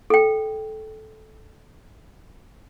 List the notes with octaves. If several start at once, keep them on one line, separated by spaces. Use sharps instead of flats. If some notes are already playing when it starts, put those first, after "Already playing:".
A4 G5